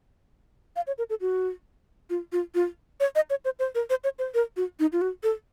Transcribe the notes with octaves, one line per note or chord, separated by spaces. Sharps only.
F5
C#5
A#4
A4
F#4
F4
F4
F4
C#5
D#5
C#5
C5
C5
A#4
C5
C#5
C5
A#4
F#4
D#4
F4
F#4
A4